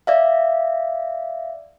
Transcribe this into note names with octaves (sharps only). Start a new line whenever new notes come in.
D5 E5 F5